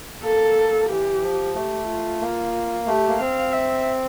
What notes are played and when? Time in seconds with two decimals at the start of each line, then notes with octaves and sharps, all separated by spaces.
0.23 A#3 A4
0.89 E3 G4
1.23 F3
1.54 A3 G4
1.88 F4
2.21 A#3
2.86 A3 G4
3.09 A#3
3.20 C4 F5
3.52 E5